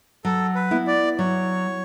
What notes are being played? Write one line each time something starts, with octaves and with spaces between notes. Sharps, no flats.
F#3 A4
B4
B3 E4
D5
F#3 C#5